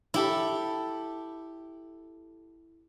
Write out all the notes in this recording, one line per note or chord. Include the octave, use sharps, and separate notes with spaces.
E4 G4 A4